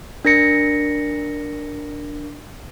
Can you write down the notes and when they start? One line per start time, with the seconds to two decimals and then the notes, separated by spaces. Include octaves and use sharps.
0.25 D4 A#4 A#6 C#7